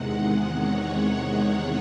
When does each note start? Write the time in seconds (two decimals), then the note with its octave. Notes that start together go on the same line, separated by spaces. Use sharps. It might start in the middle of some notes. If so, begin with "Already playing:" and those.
Already playing: E2 C3 D#3 G#3 F#5
0.54 C#5